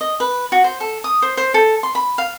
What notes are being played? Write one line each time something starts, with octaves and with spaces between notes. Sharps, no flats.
D#5
B4
F#4
C5
A4
D#6
C5
C5
A4
C6
B5
F5